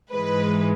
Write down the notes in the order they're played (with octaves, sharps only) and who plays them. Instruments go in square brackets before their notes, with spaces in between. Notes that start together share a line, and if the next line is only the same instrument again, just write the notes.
[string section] G#2 E3 G#3 B4